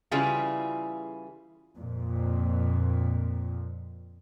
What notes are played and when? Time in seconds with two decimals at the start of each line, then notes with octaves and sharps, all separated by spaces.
0.11 C#3 E3 G3 E4 F4 G#4
1.78 F2 A#2